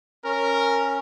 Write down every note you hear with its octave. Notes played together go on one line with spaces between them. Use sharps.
C#4 A#4